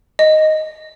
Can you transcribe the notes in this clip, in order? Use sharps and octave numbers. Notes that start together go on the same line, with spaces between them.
D#5